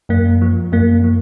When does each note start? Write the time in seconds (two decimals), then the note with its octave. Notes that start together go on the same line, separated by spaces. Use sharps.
0.09 F#2 A#3
0.42 F3
0.72 F#2 A#3
1.04 F3